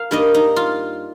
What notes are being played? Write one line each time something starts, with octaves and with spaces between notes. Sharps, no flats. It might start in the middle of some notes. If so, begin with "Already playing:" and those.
Already playing: A#4 F5
G2 G3 A#3 D#4 D#5
D#4
F4